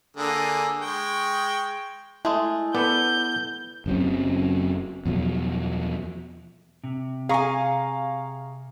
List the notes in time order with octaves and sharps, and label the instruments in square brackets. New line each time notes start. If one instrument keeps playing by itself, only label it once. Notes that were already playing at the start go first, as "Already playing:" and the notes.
[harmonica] D3 A#3 G#4
G#3 G5 C#6
[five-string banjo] G#3 A3 [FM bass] E4
[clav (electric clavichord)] B3 A4 B4 [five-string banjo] D5 [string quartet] G6
[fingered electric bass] F#1 C#3 F#3 C4
E2 B2 F3 F#3
[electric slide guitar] C3
[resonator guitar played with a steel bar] G#4 G#5 [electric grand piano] F5 A#5 C#6